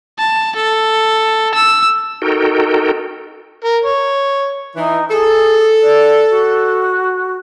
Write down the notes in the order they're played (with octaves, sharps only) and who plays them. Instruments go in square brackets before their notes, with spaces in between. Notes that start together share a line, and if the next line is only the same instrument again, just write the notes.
[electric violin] A5
A4
E6
[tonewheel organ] D#4 F#4 A4 A#4 G5
[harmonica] A#4
C#5
[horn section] E3 [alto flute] D#4
[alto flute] G#4 [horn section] A4
[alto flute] D5
F#4